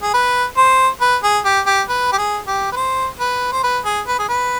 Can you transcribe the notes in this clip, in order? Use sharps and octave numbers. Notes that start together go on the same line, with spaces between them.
G#4
B4
C5
B4
G#4
G4
G4
B4
G4
G#4
G4
B4
C5
B4
C5
B4
G#4
B4
G#4
B4